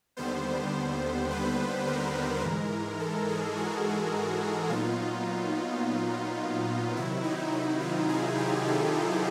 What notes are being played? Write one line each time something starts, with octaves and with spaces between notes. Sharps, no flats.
D#2 D3 G3 B3 C5
B4
A#4
G#2 E3 G#3
A4
G#4
F#4
A#2 F#3 B3 D#4 F4
C3 D#3 F#3 E4
D#4
E4
F4
G#4
G4
A4